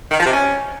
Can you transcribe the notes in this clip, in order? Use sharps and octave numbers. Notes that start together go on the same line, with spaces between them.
D#3
F3
C3
C#4